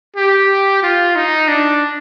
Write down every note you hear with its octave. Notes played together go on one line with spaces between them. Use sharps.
G4
F4
D#4
D4